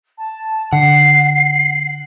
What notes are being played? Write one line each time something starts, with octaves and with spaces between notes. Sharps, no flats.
A5
D3 F#5 C7